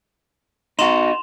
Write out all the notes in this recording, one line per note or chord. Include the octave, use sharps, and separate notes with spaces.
D#4 F#4 C6 E7 F7